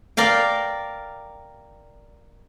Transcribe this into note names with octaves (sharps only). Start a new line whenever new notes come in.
A#4 D5 F5 G5